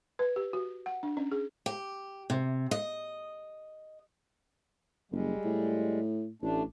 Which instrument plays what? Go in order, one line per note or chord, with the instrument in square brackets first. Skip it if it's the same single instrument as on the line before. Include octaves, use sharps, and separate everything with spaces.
[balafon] B4
G4
F#4
F#5
D4
C#4
G#4
[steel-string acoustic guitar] G4
C3
D#5
[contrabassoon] F#1 [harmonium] G3 G#3
[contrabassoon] A2
[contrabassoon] A1 [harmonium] A3 D4